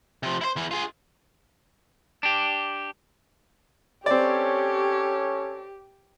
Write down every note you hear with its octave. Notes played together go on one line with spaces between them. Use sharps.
C3 F3
E4 C5
E2 E3
F4 G#4
D4 G4
C4 C#4 G4 A4 C#5 D5